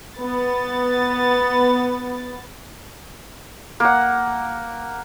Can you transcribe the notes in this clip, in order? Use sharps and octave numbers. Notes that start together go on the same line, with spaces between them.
B3 A6
A#3 F#5